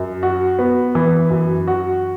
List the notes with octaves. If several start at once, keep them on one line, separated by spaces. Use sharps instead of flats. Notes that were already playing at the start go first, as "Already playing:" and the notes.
Already playing: F#2
F#4
B3
E3
F#2
F#4